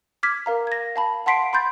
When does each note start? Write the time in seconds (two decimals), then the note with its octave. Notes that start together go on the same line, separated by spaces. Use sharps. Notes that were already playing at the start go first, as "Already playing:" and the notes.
0.23 D6 F6 G#6 B6
0.46 A#4 F5 A#5
0.67 G#6 A#6
0.96 F5 A5 B5
1.26 F#5 A5 C6 B6 C7 D7
1.53 B5 C6 G6 A6